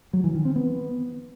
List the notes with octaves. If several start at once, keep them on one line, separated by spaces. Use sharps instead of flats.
F#3
E3
D#3
C4
B3